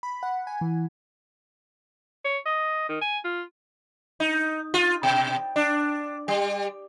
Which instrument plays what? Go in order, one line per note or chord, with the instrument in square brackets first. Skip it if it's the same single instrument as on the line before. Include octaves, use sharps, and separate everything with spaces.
[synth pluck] B5
F#5
G#5
E3
[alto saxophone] C#5
D#5
D#3
G#5
F4
[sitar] D#4
F4
B2
D4
G3